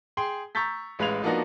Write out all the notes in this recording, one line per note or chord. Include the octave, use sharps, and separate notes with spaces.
G#4 G5 C6
A#5 C#6 E6 G6 A6 B6
A1 G#3 B4 F5 G#6 F7
F3 A#3 B3 D4 D#4 F#4